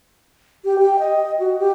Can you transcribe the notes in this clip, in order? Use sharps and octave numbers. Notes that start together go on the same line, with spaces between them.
G4
G5
D#5
F#4
G4